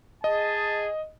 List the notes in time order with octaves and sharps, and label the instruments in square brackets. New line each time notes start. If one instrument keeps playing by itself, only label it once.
[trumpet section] G#4 A5 [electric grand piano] D#5